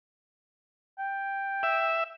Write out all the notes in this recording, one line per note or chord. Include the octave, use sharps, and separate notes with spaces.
G5
E5